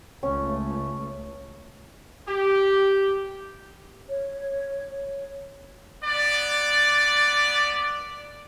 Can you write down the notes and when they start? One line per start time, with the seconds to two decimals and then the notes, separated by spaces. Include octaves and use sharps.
0.23 C#2 A3 C#4
2.28 G4
4.09 C#5
6.04 B3 D5